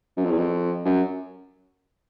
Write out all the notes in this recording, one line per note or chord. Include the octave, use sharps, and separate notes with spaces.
F#2
F2
E2
F2
F#2